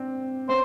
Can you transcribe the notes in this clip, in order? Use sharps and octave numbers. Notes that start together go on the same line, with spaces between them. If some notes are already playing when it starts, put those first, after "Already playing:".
Already playing: C4 D4
B3 C#4 C5